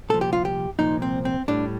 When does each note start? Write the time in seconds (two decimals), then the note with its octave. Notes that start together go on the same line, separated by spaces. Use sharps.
0.09 C2 A#2 F3 A4
0.21 G4
0.33 F4
0.45 G4
0.79 C2 A#2 F3 D#4
1.02 C4
1.25 C4
1.48 A2 G3 D4